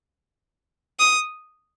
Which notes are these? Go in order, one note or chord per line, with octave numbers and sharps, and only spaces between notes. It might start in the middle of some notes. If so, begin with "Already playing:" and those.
D#6